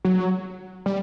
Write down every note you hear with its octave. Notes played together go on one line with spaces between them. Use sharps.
F#3
G3